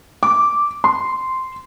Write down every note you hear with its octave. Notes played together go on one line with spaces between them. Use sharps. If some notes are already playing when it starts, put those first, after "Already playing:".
D6
C6